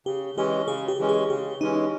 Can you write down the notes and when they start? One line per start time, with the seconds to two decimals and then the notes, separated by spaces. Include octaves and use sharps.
0.06 C#3 G4
0.37 E3 G#3 C#4 G4
0.67 C#3 G#4
0.88 G4
0.99 E3 G#3 C#4
1.09 G#4
1.30 C#3 G4
1.61 E3 G#3 C#4 D#4